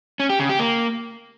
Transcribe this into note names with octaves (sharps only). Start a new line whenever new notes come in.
C#4
G4
C#3
G4
A#3